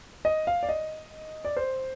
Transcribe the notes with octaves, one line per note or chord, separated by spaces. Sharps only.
D#5
F5
D5
D#5
D5
C5